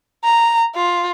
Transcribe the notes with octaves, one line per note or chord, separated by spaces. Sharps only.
A#5
F4